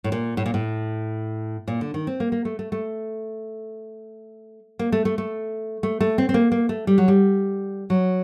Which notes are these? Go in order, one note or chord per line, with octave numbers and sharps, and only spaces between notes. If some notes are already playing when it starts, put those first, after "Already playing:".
A2
A#2
A2
A#2
A2
A#2
D3
D#3
C4
A#3
A#3
A3
A3
A3
A#3
A3
A3
A3
A3
A3
C4
C4
A#3
A#3
A3
G3
F#3
G3
F#3